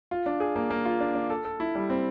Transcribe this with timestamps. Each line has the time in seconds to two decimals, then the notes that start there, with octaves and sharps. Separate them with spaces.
0.11 F4
0.26 D4
0.40 G#4
0.56 A#3
0.70 A#3
0.85 F4
1.00 D4
1.15 D4
1.30 A4
1.45 A4
1.60 E4
1.75 G3
1.90 C4